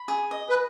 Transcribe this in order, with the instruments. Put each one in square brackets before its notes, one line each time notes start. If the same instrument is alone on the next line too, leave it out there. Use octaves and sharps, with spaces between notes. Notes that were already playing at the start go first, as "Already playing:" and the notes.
Already playing: [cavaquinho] B5
G#4
D#5
[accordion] B4